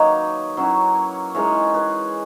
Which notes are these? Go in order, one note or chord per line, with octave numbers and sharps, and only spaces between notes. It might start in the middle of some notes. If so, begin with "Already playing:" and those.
Already playing: D#3 F#3 A#3 D#4 B4 C#5 D#5
F#3 C#4 E4
E3 G#3 D#4 A#4 C#5
G#4 B4